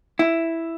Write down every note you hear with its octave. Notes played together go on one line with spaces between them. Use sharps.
E4